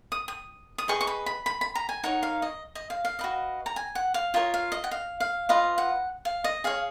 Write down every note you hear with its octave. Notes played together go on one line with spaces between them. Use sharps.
D#6
D#6
D#6
G#4 B4 D#5 C#6
C#6
B5
B5
B5
B5
A#5
G#5
D#4 A#4 C#5 F#5
F5
D#5
D#5
F5
F5
F#4 B4 D#5
A#5
G#5
F#5
F5
F4 A#4 C#5 D#5
F5
D#5
F#5
F5
F5
F4 B4 D#5 F5
F#5
F5
D#5
G#4 C#5 F5